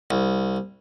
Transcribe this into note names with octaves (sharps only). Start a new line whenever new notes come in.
C2